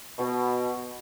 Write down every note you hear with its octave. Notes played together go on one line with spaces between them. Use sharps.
B2